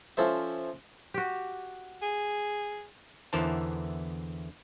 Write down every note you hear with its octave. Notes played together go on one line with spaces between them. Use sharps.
F3 C#4 A4 C5 E5
F#4 G4
G#4
E2 D3 E3 A#4 C5 A5